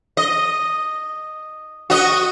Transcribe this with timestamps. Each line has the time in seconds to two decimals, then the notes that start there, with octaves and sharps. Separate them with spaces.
0.17 D#5
1.90 F#4 D#5